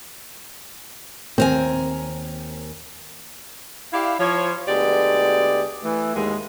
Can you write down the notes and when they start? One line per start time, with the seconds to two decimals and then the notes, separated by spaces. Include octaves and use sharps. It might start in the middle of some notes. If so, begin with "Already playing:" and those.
1.38 D#2 C4 A#4 G#5
3.93 E4 G4 D5 F5
4.19 F3 C#5
4.68 D2 G#3 B3 G4 D5
5.83 E3 A3
6.15 D#2 G#2 D#3 G#3